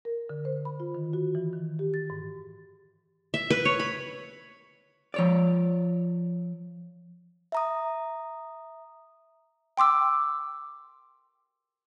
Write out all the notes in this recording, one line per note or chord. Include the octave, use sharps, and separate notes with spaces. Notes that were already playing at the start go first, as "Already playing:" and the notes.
A#4
D3
C5
B5
F4
D#3
F#4
E3
D#3
G4
A6
G#2
E5
B4
C#5
B5
F3 C#5 D5
E5 A#5 D#6
G5 C6 D6 E6